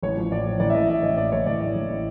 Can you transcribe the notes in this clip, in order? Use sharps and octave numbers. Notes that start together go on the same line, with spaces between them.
A1 C#5
F3
A2 D5
F3
A1 D5
E5
A2 D#5
A1 E5
A1 D#5
A2 D5
A1 C#5
A1 D5
A1 D#5
A1
A2